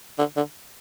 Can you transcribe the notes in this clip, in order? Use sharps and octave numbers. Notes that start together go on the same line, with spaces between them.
D3
D3